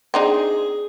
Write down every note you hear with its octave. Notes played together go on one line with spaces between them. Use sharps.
C4 D4 D#4 G#4